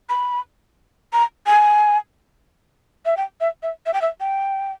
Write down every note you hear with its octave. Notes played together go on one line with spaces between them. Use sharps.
B5
A#5
G#5
E5
G5
E5
E5
E5
G5
E5
G5